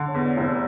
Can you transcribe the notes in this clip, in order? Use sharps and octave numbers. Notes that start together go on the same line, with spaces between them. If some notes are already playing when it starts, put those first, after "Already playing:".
Already playing: D3
C#5
E2
D5
F1 D5